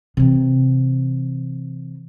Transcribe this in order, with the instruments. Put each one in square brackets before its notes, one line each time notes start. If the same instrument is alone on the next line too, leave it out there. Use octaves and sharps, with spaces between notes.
[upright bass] C3 E3